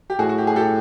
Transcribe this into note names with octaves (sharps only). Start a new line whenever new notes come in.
G4
A2 F#4 G#4
F#4
G4
G#4
G4 A4